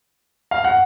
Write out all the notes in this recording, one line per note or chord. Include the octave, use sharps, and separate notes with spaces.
F5
F#5